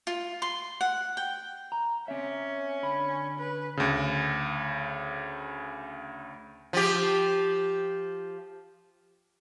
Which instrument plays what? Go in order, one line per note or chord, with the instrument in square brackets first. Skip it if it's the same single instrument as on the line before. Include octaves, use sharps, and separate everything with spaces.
[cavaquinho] F4
C6
F#5
G5
[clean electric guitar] A#5
[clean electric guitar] C4 E5 [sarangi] C#4
[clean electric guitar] D3 B5
[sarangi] B4
[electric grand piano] D2 C#3
[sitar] F3 G4